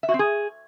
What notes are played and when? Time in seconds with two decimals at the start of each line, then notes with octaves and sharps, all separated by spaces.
0.03 E5
0.08 F#4
0.14 C4
0.19 G#4